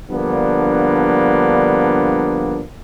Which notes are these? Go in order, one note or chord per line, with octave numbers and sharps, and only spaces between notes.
D3 F3 G3 A#3 B3 D4